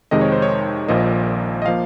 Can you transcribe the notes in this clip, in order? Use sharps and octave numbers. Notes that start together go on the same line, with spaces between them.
F2 C3 D#3 G#3 D#5
C#5
C5
C#5
A#1 A#2 F3 A#3 D#5
D#5
F3 A#3 F5